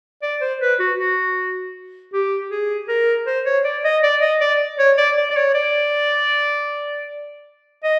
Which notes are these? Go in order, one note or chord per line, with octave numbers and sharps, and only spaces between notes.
D5
C5
B4
F#4
F#4
G4
G#4
A#4
C5
C#5
D5
D#5
D5
D#5
D5
C#5
D5
D5
D5
C#5
D5
D#5